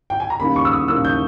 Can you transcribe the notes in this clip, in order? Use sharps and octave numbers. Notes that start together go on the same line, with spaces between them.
G5
G#5
A#5
D#2 C#3 G3 A#3 B5
C#6
E6
D#6
D#2 C#3 G3 A#3 E6
G6